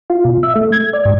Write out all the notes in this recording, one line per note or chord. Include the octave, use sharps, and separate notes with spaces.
F4
B2
E5
A3
G#6
D5
G#2